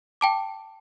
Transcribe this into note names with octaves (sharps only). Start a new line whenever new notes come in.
G5 A5 D6